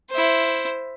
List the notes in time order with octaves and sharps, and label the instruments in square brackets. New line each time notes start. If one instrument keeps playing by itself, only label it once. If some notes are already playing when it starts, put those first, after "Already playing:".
[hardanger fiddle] E4 C5